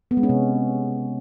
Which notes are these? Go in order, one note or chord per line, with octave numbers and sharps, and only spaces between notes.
B3
G#3
C#4
C3